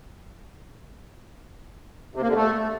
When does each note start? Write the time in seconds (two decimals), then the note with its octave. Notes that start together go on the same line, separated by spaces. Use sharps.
2.15 C3
2.22 A#3
2.29 D3
2.35 A3